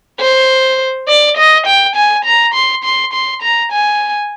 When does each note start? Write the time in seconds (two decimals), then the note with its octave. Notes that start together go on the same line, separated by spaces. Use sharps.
0.20 C5
1.08 D5
1.37 D#5
1.66 G5
1.96 G#5
2.25 A#5
2.54 C6
2.84 C6
3.13 C6
3.42 A#5
3.72 G#5